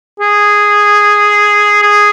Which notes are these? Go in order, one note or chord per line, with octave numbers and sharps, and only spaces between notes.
G#4
G#4